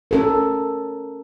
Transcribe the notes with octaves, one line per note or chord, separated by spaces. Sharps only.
C#4 A4 A#4